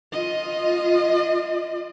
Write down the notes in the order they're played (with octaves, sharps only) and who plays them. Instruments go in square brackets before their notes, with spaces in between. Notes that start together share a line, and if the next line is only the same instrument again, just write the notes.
[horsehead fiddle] F4 D#5